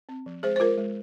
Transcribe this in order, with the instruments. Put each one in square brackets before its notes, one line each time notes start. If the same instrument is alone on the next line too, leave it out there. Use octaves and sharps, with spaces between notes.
[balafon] C4
F3
G#3 G#4 C5
C5
G#3 F4 A#4
G#3